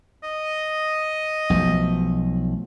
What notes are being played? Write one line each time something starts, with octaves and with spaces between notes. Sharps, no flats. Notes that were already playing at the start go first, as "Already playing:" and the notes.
D#5
B1 F3 A3